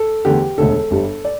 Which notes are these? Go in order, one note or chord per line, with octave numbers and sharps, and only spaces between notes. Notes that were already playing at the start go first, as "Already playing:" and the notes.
Already playing: A4
E2 D3 A3 G4
E1 D2 D3 A4
G1 G2 G3
D5